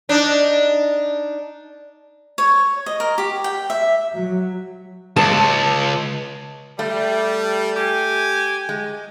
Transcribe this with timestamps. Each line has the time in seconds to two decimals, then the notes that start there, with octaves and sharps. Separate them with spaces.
0.09 D4 D#4
2.38 C#5
2.86 D#5
3.00 A#4
3.18 G4
3.44 G5
3.70 E5
4.15 F#3
5.16 C#2 A5
6.79 G3 A3
7.76 G4 G#5
8.69 G#3